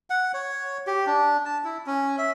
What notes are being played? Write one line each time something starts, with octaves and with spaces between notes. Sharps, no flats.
F#5
C#5
G4
D4
A5
E4
C#4
E5